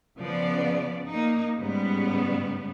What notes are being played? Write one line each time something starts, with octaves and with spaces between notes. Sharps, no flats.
C#3 F3 B3 D5
A#3 D#4
G#2 C#3 G3 B3